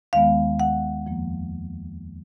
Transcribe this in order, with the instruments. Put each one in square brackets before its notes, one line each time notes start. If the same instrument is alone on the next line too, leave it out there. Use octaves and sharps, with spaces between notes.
[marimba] D#2 D#3 G#3 B3 F5
F#5
F2 F3 A#3